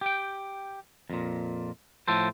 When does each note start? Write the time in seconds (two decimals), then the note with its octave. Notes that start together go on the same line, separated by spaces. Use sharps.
0.01 G4 G5
1.10 F2 A#2
2.08 A2 F3 A4 C5